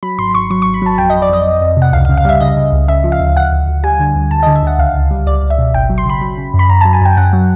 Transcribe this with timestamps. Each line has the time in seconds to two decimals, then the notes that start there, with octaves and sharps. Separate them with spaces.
0.03 F#3 B5
0.18 G#1 C6
0.34 G#1 C#6
0.50 F#3 C#6
0.62 G#1 C#6
0.74 B5
0.82 F#3 A5
0.98 F2 G5
1.10 F2 D#5
1.22 D5
1.29 F2 D#5
1.45 F2
1.61 F2
1.77 C3 F#5
1.93 C#2 F5
2.05 F5
2.09 C#3
2.18 F5
2.25 G3 E5
2.40 C#3 D#5
2.57 C#3
2.72 C#2
2.88 C#3 E5
3.04 F3
3.12 F5
3.20 D2
3.36 D2 F#5
3.52 D2
3.68 D2
3.84 G3 G#5
4.00 D3
4.16 D2
4.31 D2 A5
4.43 D3 D#5
4.55 E5
4.63 D2 F#5
4.79 C#2 F5
4.95 C#2
5.11 G3
5.27 C#2 D5
5.43 C#2
5.50 E5
5.58 B2
5.74 G#1 G5
5.90 F#3
5.98 C6
6.06 C#3 B5
6.21 F#3
6.38 C#3
6.54 F#2
6.59 B5
6.69 F#2 A#5
6.81 F#3 A5
6.93 G#5
7.01 F#2 G5
7.17 F#2 F#5
7.33 F#3